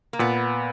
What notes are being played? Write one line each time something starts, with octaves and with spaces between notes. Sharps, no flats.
A#3
A#2 B3